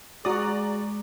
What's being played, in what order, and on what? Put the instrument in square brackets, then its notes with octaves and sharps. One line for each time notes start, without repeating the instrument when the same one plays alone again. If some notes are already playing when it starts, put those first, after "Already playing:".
[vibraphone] G#3 [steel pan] F#4 D#6 [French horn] G#4 [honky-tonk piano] D5 A#5